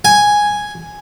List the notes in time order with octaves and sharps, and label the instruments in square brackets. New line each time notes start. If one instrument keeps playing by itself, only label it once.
[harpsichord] G#5